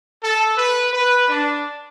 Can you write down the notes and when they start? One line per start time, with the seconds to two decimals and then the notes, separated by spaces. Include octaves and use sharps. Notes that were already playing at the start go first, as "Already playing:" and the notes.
0.23 A4
0.58 B4
0.93 B4
1.29 D4